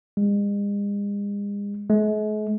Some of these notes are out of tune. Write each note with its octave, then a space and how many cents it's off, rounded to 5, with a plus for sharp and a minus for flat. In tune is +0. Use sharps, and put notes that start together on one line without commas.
G#3 -40
G#3 +45